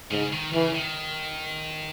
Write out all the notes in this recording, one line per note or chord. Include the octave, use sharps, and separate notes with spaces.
G#2 C#3
D#3
C#3 E3
D#3